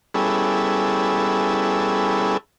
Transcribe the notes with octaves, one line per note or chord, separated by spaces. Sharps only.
G3 B3 C#4 E4 G#4 A4